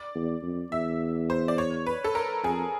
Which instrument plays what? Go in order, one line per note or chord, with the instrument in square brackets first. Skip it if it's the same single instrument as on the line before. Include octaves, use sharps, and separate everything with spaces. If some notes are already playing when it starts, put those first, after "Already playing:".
Already playing: [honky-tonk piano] D5
[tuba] E2
F2
[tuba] E2 [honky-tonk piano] E5
[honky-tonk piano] C5
D5
C#5
B4
A4
A#4
[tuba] F2 [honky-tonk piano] G#4